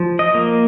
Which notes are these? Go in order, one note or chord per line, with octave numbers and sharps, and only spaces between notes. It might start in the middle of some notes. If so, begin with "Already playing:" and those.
Already playing: F3
D#5
A#3